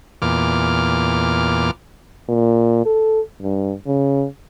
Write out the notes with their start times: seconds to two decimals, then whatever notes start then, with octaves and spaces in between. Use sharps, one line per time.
0.22 E2 A#2 D6 F6
2.29 A#2
2.86 A4
3.41 G2
3.86 C#3